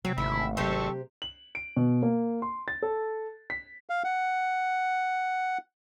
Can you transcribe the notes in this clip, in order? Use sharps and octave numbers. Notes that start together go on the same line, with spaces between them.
C3 F#3 C4
G#1 D2 E5 B5
C3 F#3 C4 G4 A4 C5 C#6
F#7
D7
B2
A#3
C6
A6
A4
B6
F5
F#5